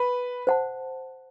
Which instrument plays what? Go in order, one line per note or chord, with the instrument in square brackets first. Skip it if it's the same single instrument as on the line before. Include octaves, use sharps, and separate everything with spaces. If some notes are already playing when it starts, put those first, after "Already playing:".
Already playing: [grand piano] B4
[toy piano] C5 F#5 A5